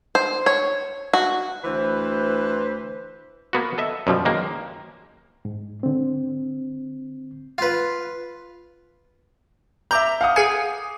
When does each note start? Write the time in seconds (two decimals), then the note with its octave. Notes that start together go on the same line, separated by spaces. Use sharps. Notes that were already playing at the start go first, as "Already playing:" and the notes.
0.15 C5
0.46 C#5
1.13 F#4
1.64 D2 E3 B4 C5
3.53 A#3 B3 F#4
3.78 A4 D#5 E5
4.07 F#2 B2 F3 G3
4.25 D#3 G#3 A#3
5.45 G#2
5.83 D3 C4
7.58 F4 B4
9.91 E5 A#5 D6 G6
10.21 F5 F#5 D#6
10.36 G#4 G#5 G#6 C7 C#7